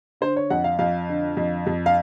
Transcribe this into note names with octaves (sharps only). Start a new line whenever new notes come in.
D3 C5
C#5
F2 F#5
F5
F2 F5
D3
F2
F2
F5